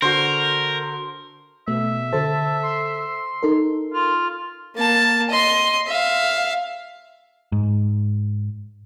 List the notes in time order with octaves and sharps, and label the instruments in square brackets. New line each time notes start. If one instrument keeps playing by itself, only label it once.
[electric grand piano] D3 F#4 [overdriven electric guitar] A#4 [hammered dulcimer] C5
[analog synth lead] B2 [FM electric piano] A3 [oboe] E5
[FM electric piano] D3 A4 C5 [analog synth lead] A5
[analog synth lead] C6
[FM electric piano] D#4 A4 A#4
[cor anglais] F4 [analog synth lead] F6
[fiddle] A#3 A5
D#5 C6
E5 F5
[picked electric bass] G#2